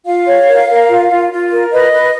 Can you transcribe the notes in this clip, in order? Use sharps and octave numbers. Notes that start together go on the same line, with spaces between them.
F4 F5
C#5
A#4
A#4
F4
F4
F4
A#4
B4 D#5
B4